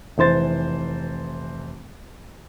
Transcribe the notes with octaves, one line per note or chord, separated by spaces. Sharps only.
F1 E3 C5 A6